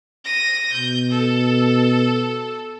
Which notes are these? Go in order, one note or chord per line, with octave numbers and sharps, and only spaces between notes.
A#6 D#7
B2 G6
A4